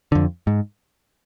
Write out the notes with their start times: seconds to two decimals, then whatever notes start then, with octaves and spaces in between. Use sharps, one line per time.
0.12 F2 D3
0.47 G#2